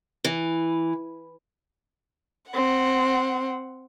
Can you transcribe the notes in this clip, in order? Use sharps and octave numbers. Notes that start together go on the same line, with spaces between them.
E3
C4 F#5